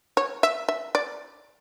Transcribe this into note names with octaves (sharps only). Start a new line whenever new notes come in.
C#5
E5
E5
D5